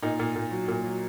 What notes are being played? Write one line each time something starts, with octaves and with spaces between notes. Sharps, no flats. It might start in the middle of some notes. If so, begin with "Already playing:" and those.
A#2 D#4
A#2
A#2
F#3
A#2
F#3